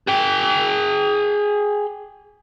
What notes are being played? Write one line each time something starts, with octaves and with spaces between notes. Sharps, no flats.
G#4 G5